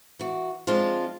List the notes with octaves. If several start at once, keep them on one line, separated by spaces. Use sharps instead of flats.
E3 F#4
F3 G#3 C4 D4 F4